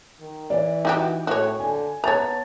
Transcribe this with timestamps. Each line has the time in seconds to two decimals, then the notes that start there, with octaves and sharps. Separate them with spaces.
0.20 D#3
0.50 E3 D5
0.85 D#4 F#4 G4 G5
1.27 A2 F#4 C#5
1.60 D3 G#5
2.04 B3 C#5 A5 A#5 A6